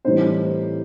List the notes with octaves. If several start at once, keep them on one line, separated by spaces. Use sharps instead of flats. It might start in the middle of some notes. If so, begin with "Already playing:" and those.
A2 E3 G3 C4 D#4 C5